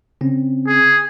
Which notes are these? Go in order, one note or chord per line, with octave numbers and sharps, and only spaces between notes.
C#3 C4 C#4
G#4